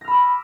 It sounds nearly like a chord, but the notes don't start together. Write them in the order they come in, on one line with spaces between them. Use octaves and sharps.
A#6 F6 B5 E6 D6